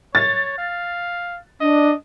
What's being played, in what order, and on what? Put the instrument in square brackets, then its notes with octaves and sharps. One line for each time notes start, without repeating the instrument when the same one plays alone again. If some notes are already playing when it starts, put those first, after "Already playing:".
[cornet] C#5 [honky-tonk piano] A6
[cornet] F5
[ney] D4 [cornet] D#5